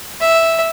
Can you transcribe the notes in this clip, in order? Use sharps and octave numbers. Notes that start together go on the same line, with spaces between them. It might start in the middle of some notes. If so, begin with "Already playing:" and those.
E5